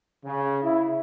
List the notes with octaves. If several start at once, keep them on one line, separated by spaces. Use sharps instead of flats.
C#3
E4